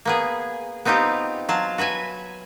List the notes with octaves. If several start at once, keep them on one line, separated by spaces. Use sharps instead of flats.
A#3 B3 G#4
B3 C4 D#4 F4 G4
F#3 F4 A5
F#4 B4 E5 G#5